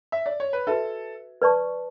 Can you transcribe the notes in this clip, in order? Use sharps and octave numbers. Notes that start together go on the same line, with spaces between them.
E5
D5
C#5
B4
F#4 A4 B4 E5
B4 D5 A5 C#6